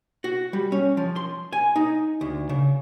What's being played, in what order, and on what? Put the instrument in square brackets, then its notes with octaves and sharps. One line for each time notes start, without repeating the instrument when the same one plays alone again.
[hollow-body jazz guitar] F#4
G3
C#4
F3
C6
G#5
D#4
D2
C#3